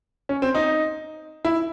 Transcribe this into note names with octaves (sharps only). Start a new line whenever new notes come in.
C#4
C4
D#4
E4